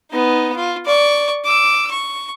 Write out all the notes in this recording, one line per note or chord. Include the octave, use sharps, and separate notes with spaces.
B3 D#4
F4
D5 C#6
D6 E6
C#6